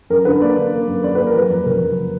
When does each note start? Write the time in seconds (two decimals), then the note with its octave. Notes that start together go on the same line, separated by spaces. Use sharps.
0.10 F#2 A#4
0.25 D3 B4
0.42 A#3 D5
0.57 D3
0.73 A#3
0.87 F#2
1.03 F#2 D5
1.15 A#3 B4
1.27 A#4
1.35 F#3 B4
1.50 F2
1.66 F#1 A#4
1.81 F#3